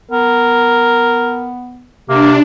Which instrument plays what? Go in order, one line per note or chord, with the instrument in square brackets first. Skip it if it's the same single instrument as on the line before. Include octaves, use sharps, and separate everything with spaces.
[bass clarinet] B3 [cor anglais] A#4
[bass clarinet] C3 [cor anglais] A#3 [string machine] D4